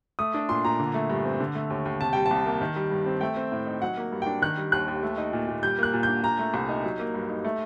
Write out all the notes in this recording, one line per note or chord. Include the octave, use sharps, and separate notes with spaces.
A3 D#6
D4
A#2 C6
A#2 A#5
D3
A3
G2
C4
D3
A3
D#2
D#2
C3 A5
G3 G5
A5
C2
A#3
D#3
G3
G2
C4
A3 G5
C4
A2
D#4
F#3 F#5
A#3
G2
D4 G5
D#3 F#6
G3
D#2 F#6
D#2
A3
D#4
A#2
A#2
G3 G6
A#3 F#6
A#2
G6
D4
A#2 A#5
A3
C2
D#4
F#3
A#3
G2
D#4
A3